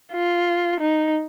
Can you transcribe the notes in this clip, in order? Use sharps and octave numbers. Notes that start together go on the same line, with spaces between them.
F4
D#4